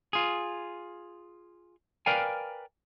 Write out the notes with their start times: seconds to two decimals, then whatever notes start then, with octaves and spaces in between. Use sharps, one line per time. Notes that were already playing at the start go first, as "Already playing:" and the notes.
0.13 F4 G#4
2.06 A#4 B4 D5 F5 G5 G#5